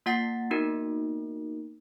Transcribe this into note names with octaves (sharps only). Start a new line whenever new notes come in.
A#3 F4 F#5 A6 C7
A#3 B3 D#4 F#4 A#4